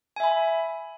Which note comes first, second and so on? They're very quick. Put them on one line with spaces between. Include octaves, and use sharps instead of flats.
G#5 E5 B5